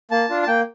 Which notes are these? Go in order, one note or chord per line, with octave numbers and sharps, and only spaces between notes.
A#3 A5
D4 F4
A5
A#3 G5